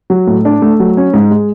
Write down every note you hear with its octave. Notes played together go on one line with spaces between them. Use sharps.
F#3
A2
D4
A3
F#3
C#4
G#2
G#3